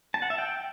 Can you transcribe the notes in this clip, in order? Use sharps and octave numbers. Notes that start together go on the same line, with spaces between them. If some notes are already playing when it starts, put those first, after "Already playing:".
A5
F#5
E5
G5